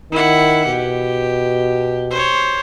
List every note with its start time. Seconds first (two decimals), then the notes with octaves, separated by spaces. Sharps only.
0.12 D#3 E4 F#5
0.66 B2 G4
2.10 C5 C#5